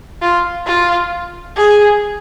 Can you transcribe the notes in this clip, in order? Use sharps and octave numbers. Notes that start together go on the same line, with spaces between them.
F4
F4
G#4